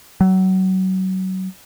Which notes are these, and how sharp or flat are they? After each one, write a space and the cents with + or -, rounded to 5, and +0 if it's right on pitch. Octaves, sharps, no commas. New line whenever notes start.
F#3 +25